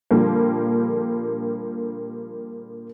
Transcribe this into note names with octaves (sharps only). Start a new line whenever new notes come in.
A#2 D3 F3 G3 A#3